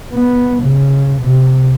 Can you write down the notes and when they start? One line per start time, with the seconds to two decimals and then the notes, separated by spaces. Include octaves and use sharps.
0.13 B3
0.63 C#3
1.21 C3